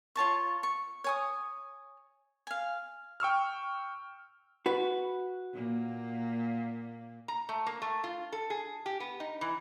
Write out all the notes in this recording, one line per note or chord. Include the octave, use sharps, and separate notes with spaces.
F4 C#5 A5 C#6
C#6
C#5 G#5 D#6
F5 G#5
G5 C#6 E6 F6
F#4 B4
A#2 A#3
A#5
A3
A#3
A3
F4
A4
G#4
G4
B3
D#4
E3